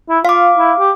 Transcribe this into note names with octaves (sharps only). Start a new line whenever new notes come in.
E4
F4 F5 D6
E4
G4